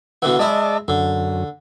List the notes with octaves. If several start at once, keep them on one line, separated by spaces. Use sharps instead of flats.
B2 D3 E3 F#5
G#3 E4 D5 D#5 A5
F#2 D3